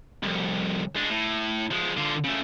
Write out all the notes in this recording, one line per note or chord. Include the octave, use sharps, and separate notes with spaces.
C2 F2
G#3 D4
A2
F3 G#3
D3 F4
C#3 A3